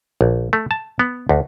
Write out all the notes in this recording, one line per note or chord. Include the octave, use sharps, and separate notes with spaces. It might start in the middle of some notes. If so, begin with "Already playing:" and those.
A#1
A3
A5
B3
D2